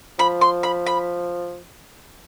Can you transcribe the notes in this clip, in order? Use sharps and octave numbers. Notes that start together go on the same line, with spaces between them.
F3 B5
C6
B5
B5